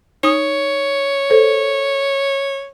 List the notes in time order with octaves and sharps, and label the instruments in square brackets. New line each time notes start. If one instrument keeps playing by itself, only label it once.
[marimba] D#4 D#6 [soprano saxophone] C#5
[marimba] A4 C5